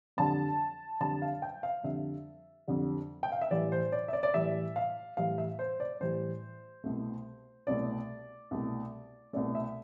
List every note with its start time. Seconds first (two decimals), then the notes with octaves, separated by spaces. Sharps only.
0.17 F2 D3 G3 A5
1.00 F2 D3 G3 A5
1.22 F5
1.42 G5
1.63 F5
1.83 F2 D3 G3 E5
2.68 F2 D3 G3
3.23 G5
3.32 F5
3.41 E5
3.51 A2 E3 G3 D5
3.72 C5
3.92 D5
4.08 E5
4.13 D5
4.23 D5
4.34 A2 E3 G3 E5
4.76 F5
5.17 A2 E3 G3 F5
5.38 E5
5.59 C5
5.80 D5
6.00 A2 E3 G3 C5
6.84 C2 B2 A3
7.67 C2 B2 A3 D5
8.51 C2 B2 A3
9.33 C2 B2 A3 D5
9.55 E5